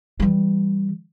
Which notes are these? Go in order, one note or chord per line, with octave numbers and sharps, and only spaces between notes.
E3 G3